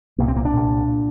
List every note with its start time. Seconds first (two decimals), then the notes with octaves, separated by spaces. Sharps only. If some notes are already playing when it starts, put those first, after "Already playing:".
0.18 C2 A#2 A#3
0.28 C4
0.37 A#3
0.45 D4
0.53 C2 A#2
0.88 A#2